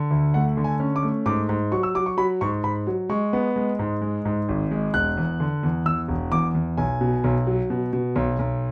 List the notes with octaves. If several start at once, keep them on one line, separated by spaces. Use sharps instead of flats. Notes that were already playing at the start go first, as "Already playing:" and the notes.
Already playing: D3
D2
A3 F#5
D3
G#5
C#4
D6
A3
G#2 D6
G#2
F#3 C#6
E6
F#3 D6
C#6
F#3 B5
G#2 C#6
G#2 B5
F#3
G#3 C#6
B3
G#3
G#2
G#3
G#2
G#1
G#3
E1 F#6
E2
D3
E2
E2 E6
E1
E2 D6
E2
B1 G#5
B2
B1
F#3
B2
B2
B1
B1